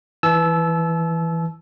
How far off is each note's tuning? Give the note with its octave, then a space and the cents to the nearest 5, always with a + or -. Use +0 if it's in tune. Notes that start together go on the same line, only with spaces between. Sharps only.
E3 +0 A5 -40 E6 +0